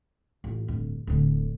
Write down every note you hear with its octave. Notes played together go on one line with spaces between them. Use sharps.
A1 F4
D1 G2
D1 D2